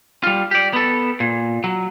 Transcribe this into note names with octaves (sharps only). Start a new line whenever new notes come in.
G3 F4
G4 D5
B3 A4
A#2
F#3